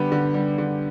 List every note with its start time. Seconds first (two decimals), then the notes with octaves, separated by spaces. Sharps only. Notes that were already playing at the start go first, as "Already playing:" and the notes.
Already playing: D3 G3 B3 G4
0.12 D3
0.34 G3
0.58 D3